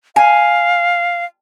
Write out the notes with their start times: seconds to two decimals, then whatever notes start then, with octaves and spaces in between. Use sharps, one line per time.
0.16 F5 G#5